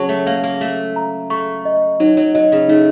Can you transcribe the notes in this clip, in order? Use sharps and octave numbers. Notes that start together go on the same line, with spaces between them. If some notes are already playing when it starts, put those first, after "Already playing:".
Already playing: C#3 F#3 A5 C#6
A3
A#3 F5
A#3
A3 A4
A#5
A3 C#6
D#5
F#3 D#4
F#3
F#3 D#5
C#3
A3 D#4